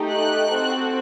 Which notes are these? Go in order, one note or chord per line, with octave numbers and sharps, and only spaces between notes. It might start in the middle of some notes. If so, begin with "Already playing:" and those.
Already playing: A3 D#4 G4
F#6
C4 F#4 A4